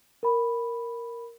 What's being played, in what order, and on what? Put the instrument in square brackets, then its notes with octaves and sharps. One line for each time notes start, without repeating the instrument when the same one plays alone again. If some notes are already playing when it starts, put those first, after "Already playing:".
[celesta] A#4 B5